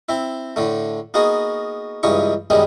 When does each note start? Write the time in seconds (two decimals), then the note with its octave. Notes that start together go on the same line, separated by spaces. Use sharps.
0.09 C4 E4
0.56 A2 D3 A3
1.14 A#3 B3 D#4 F#4 G#4
2.03 C#2 G2 E3 D#4 C#6
2.50 F#2 D#3 G3 G#3 B3